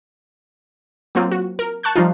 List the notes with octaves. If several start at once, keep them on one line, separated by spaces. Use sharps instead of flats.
F#3 A#3 C4 F4
F#4
A#4
A5 C#6 F#6 G6
F3 G3 D#4 F4